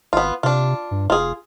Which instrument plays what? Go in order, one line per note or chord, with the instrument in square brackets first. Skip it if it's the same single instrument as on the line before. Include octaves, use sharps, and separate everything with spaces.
[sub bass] G#1 [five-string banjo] B3 F4
[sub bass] C3 [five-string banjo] D4 F4
[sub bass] G2
[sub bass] F1 [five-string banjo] F4 G#4